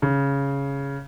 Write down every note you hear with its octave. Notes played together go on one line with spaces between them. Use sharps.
C#3